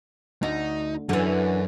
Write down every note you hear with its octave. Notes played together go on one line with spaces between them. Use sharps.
D2 D#4
F#2 D3 E3